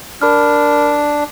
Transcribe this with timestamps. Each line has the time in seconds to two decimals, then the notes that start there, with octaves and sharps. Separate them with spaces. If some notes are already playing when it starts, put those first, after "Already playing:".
0.21 D4 A#4 B5 F6